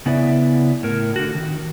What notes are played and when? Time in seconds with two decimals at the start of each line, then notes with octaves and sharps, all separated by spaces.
0.06 C#3 B3 E4 B4 D5 E5
0.83 A2 A#4
1.16 D3 F#4
1.35 D#3